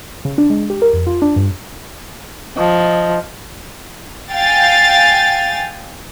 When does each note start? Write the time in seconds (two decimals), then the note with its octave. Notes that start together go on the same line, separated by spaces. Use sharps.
0.25 C#3
0.38 D4
0.50 G#3
0.70 G4
0.82 A#4
0.93 F2
1.07 F4
1.22 D4
1.36 G2
2.57 F3 D#5
4.32 F5 G5 G#5 A6